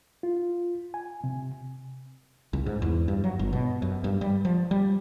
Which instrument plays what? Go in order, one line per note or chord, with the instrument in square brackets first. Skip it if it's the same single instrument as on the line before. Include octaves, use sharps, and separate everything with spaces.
[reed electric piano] F4
G#5
C3
[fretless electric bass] C2
G#2
E2
G2
F#3
G1
B2
F#2
G2
G3
F3
G3